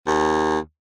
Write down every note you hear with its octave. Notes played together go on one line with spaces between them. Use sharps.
D#2